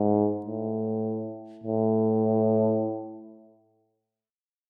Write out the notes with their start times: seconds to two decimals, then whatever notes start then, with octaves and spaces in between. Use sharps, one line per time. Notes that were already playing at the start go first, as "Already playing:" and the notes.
Already playing: G#2
0.46 A2
1.64 A2